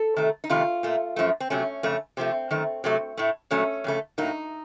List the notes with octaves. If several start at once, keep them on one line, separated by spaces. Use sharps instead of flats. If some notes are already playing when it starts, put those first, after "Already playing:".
Already playing: A4
C3 D#3 A3
D#4
F2 C3 D#3 A3 F4
A#2 A3
F#2 F3 A3
C4
C3 F#3 A3 C#4
F2 C#3 A3
C3 F3 A3 C4
F#2 D#3 A3
C3 F#3 A3
A2 A3
A#2 F#3 A3 C#4
F2 C#3 A3
A2 F#3 A#3 D#4